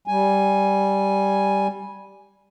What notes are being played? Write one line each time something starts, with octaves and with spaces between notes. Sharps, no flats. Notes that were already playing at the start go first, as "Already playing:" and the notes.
G3 G#5